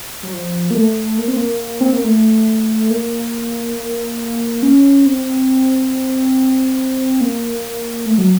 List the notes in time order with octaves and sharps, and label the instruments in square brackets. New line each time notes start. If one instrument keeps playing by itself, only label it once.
[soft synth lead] F#3
F3
A#3
A3
A#3
C4
A#3
C4
A#3
A3
A#3
C#4
C4
A#3
A3
F#3